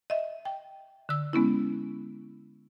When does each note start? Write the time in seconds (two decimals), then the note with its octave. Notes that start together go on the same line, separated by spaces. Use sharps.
0.10 D#5 E5
0.45 G5
1.09 D3 E6
1.33 G#3 B3 C#4 E4